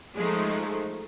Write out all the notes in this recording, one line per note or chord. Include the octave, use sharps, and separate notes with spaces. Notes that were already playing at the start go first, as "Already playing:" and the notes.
F3 G#3 A3 D#4